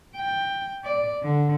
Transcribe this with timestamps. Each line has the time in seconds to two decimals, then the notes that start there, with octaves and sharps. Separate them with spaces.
0.17 G5
0.85 D5
1.23 D3